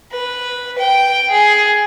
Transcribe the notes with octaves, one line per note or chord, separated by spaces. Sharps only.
B4
G5
G#4